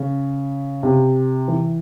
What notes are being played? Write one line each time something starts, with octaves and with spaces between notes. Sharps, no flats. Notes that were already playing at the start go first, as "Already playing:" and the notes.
Already playing: C#3
C3
E3